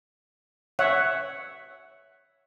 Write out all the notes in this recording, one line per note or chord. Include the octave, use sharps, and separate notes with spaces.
C#5 E5 F#5